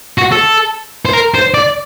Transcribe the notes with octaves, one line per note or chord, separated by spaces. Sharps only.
F#4
A4
C5
A#4
C5
D5